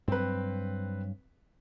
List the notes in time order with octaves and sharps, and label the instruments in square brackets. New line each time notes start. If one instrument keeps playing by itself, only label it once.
[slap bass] G2 F#3 [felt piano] C4 B4